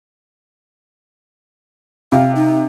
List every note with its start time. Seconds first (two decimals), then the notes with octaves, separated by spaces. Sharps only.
2.12 C3 F5
2.36 D#4